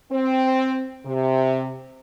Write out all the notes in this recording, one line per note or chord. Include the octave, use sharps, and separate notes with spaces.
C4
C3